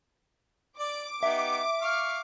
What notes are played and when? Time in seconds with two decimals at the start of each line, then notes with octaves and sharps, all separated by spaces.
0.79 D5 D6
1.23 B3 D#4 G4 E5
1.82 F5 C#6 F6